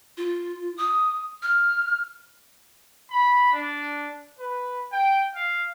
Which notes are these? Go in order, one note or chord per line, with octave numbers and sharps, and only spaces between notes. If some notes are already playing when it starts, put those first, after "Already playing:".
F4
D#6
F6
B5
D4
B4
G5
F5